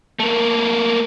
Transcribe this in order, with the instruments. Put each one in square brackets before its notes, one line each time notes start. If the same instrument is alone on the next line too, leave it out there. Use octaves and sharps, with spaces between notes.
[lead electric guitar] A3 A#3